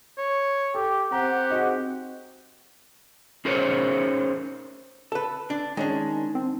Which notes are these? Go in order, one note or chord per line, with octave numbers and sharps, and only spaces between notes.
C#5
G4 A4
C4 G4 F#5 A#5
D#4 F#4 G#4
C#4 D#4 G#4 A#4 C5 C#5
A4 B4
D4
D#3 G#3 C#4 D4
C4